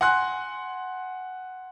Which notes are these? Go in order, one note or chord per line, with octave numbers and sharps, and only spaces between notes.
F#5 G#5 C6 F#6